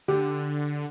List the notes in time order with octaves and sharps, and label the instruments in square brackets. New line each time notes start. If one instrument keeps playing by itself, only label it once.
[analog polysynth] D3 [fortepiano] G4